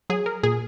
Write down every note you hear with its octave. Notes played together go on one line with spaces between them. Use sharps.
F#3 G#4
A#4
A#2 G#4